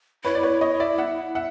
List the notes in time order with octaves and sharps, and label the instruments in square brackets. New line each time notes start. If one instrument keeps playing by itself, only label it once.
[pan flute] E4 [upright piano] B4 C#5
[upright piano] D5
B4 C#5
C#5 D#5
D5 E5
E5 F#5
E5 F#5